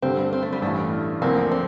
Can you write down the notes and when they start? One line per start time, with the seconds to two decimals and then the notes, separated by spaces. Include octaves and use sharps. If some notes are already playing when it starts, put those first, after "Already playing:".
0.02 G1 G2 D3 G3 C4 D4
0.33 C4
0.43 A3
0.53 G3
0.62 A1 G2 E3 A3
1.22 D2 D3 F3 A#3 C4
1.52 C4